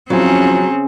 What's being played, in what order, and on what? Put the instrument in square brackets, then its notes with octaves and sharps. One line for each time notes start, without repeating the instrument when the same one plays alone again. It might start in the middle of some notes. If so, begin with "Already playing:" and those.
[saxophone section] E2 F3 [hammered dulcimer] C#3 G#4 [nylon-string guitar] F#3 [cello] C4 C#4